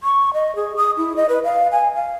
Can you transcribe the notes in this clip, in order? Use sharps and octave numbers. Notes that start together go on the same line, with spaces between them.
C#6
D#5
G#4
D#6
E4
D#5
B4
F5
G#5
F5